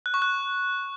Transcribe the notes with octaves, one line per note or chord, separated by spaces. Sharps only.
F#6
C#6
F#6